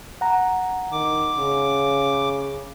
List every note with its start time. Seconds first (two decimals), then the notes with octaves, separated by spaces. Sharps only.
0.21 F#5 A#5
0.92 D#3 D6
1.38 C#3